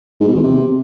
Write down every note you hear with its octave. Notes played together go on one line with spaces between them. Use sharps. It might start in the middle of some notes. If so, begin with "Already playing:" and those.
G#2
B2
E2
C3